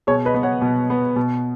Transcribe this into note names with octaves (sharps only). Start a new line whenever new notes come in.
B2 G#4 C#5
B4 D#5
B3
C#5 F#5
B2
B3
B2